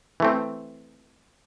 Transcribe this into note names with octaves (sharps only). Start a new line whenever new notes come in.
E3 A3 C4